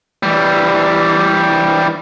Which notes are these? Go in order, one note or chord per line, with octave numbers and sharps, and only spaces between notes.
E3 G3